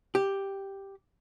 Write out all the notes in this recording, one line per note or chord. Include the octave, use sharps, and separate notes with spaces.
G4